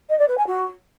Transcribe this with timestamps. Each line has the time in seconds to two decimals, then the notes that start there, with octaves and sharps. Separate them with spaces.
0.09 D#5
0.19 D5
0.28 B4
0.38 G#5
0.47 F#4